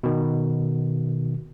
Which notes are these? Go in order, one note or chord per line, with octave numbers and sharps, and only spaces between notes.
B2 D#3